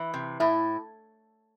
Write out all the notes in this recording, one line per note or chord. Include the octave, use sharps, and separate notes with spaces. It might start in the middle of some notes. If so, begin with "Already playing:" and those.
Already playing: E3
C3
A2 E4